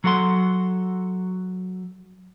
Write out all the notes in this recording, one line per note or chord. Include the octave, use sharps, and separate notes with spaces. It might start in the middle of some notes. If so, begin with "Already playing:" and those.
F#3 F#4 A4 F#5 C6